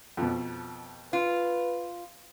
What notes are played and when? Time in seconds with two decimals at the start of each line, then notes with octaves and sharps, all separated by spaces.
0.17 F2 B2
1.13 F4 B4